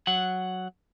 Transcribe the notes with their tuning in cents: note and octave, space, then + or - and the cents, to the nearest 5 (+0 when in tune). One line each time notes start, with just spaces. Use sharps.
F#3 +0 F#5 +0